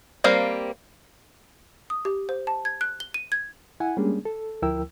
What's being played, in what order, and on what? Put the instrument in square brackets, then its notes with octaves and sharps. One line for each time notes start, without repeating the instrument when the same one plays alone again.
[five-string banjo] G3 A#3 C4 F5 A#5
[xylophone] D#6
G4
C5
A5
G#6
F#6
G7
D#7
G#6
[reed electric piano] E4 F#5 G#5
G3 G#3 A#3 C#4 D4 G#4
A4
D2 F3 E4 A#4 G5 E6